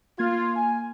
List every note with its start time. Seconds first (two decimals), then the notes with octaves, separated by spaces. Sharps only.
0.19 A#3 F4 G#6
0.56 G#5